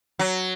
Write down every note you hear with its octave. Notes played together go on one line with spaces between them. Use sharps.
F#3